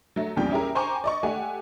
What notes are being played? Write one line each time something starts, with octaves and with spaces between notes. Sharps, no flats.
F#3 A3
A#1 E2 C#3 G3 F4 G5
C#4 E4 G4 G#4 A#4
C5 G5 G#5 A#5 C#6 D6
D5 D#5 C#6
A3 G4 F#5 G#5